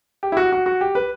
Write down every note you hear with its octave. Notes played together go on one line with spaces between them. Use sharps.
G4
E4
F#4
F#4
F#4
G4
B4